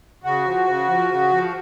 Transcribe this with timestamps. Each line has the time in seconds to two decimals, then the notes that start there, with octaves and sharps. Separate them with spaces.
0.24 C#3 F#4
0.45 F3
0.66 C#3
0.88 F3
1.10 C#3
1.31 F3